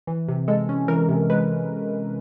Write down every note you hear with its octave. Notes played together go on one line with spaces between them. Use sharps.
E3
C3
G#3 A4
C#4
E3 A#4
C3
G#3 B4